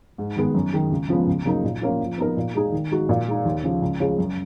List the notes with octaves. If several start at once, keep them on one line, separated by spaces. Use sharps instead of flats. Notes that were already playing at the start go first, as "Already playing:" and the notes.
G#2
D#3 G#3 B3
F#2
D#3 G#3
C#2
C#3 F3 G#3 B3
C#2
C#3 F#3 A#3 D#4
A#2
F3 A#3 C#4 F4
F3
B3 D#4 A#4
A#2
G#3 D#4 G#4
D#3
G#3 D#4 F#4
A#2
G#3 D#4
D#2
C#3 F3
C#2
C#3 F3 G#3 C#4
F#2